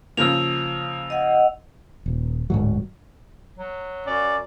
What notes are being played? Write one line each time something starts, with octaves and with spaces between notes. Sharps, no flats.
C#3 F3 A#3 E6 F7
D#5 F#5
D#1
D1 G#2 F#3
F#3
F#2 C#4 D5